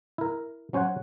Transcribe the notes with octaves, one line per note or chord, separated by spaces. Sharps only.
E4 A#4
F#3 C#4 C5 C#5 F#5